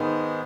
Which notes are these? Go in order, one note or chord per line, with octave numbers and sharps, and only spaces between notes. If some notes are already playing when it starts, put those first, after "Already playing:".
Already playing: G#2 D#3 G#3 B3